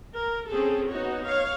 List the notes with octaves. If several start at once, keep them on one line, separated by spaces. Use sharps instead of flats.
A#4
C4 C#4 G#4 A4
B3 D#4 F#4 C#5
C#5 F5